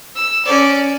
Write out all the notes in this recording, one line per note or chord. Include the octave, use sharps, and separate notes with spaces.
E6
C#4 D5